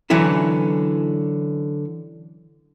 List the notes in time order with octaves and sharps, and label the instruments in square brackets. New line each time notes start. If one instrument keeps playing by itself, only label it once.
[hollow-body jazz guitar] D3 E3 F#3 C#4 E4 A4